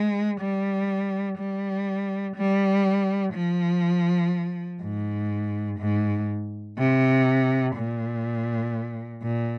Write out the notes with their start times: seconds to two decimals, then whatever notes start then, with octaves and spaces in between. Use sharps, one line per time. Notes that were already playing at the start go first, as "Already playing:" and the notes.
Already playing: G#3
0.40 G3
1.38 G3
2.36 G3
3.34 F3
4.81 G#2
5.79 G#2
6.78 C3
7.76 A#2
9.22 A#2